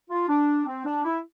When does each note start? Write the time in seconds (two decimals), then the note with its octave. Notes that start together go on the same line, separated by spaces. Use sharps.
0.10 F4
0.29 D4
0.66 C4
0.85 D4
1.04 E4